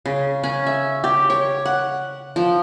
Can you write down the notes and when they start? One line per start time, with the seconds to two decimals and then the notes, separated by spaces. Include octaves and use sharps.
0.06 C#3
0.44 C#4
0.67 E5
1.04 G4
1.30 C#5
1.66 F#5
2.36 F3